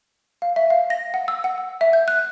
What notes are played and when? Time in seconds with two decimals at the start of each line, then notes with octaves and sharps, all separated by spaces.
0.42 F5
0.56 E5
0.70 F5
0.90 A#6
1.14 F#5
1.28 E6
1.44 F#5
1.58 E6
1.81 E5
1.93 G6
2.08 F#6